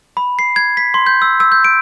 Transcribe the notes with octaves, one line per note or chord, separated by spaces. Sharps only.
B5
C7
G#6
B6
C6
G6
E6
E6
G6
D7